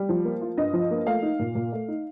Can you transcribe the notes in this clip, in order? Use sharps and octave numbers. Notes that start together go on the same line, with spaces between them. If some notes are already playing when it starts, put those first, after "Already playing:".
Already playing: G3
F3
A#3
F4
G2 D#5
F3
A#3
A3 F5
D#4
A#2
A#2
A3
D#4